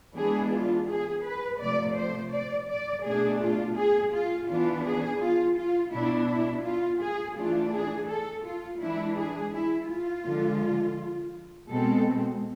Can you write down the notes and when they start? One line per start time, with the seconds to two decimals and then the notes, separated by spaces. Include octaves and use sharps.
0.17 E3 G#3 B3 D4 G#4
0.53 F4
0.89 G#4
1.25 B4
1.61 C3 F3 A3 D5
1.97 C5
2.33 D5
2.69 D5
3.05 B2 A3 D4 G#4
3.41 F4
3.77 G#4
4.13 F4
4.49 E3 B3 D4 F4
4.85 G#4
5.22 F4
5.57 F4
5.93 B2 B3 D4 E4
6.29 E4
6.65 F4
7.01 G#4
7.37 E3 A3 D4 F4
7.73 G#4
8.09 A4
8.45 F4
8.81 E3 G#3 D4 E4
9.17 G#4
9.53 E4
9.90 F4
10.25 D3 F3 G#3
11.70 B2 G#3 C4 A4